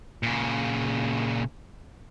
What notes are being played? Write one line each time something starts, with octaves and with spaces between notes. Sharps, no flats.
A#2 C#3